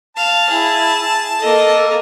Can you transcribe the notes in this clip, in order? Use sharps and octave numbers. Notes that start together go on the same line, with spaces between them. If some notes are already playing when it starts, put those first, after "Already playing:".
F5 A5
E4 G#4
A#3 A4 D#5